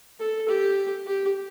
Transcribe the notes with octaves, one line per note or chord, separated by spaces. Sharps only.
A4
G4
G4